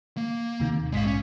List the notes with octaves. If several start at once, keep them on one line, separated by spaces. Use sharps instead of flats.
A#3
D#2 C3 D#3
A#1 G#2 G#3 F5 B6
C#4